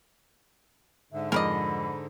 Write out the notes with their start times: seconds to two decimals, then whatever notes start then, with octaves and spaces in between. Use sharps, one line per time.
1.13 G#2 D3 E5
1.32 F2 G#3 A#4 D5 D#5 B5